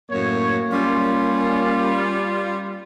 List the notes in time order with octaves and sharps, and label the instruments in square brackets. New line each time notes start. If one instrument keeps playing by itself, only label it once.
[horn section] F#2 A2 C#5 [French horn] A#3
[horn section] G3 F4 [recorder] C#4